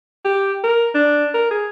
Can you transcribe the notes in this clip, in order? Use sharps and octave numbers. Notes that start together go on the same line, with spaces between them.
G4
A#4
D4
A#4
G#4